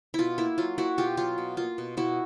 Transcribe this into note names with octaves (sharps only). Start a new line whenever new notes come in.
B2 E4 F4
A#3 E4
F#3 F4
A#3 E4 F#4
B2 F4 G4
F#3 F4
B2
A#3 F4
B2
B2 E4 F#4